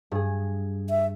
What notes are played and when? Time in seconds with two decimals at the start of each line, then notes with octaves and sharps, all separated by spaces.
0.11 G2 G#4
0.90 E5